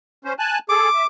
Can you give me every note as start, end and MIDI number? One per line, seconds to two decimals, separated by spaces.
0.25 0.33 61
0.25 0.33 72
0.39 0.58 80
0.39 0.58 81
0.39 0.58 90
0.69 0.89 68
0.69 0.89 69
0.69 1.07 86
0.95 1.05 76